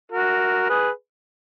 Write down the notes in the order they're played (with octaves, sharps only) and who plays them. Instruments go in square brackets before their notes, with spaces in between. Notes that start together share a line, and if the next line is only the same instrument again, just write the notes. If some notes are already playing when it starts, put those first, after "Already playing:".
[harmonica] F#4 A#4
G#4 B4